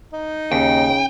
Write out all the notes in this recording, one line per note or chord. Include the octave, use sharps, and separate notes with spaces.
D#4
D#2 C#3 G5